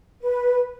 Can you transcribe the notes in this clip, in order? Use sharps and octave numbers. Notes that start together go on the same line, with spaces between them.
B4